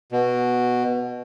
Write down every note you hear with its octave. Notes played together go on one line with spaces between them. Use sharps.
B2